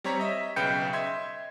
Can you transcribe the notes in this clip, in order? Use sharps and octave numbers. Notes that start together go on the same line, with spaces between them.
G3 C4 C#5 A#5 B6
D#5 E5
B1 C#3 B4 G5 G6 C#7
D#5 E5 C6 G#6